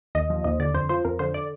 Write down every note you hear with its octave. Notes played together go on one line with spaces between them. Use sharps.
D#2 D#5
F3
D#2 D#5
D3 D5
F2 C5
F3 C5
F2 A#4
D3 C5
D5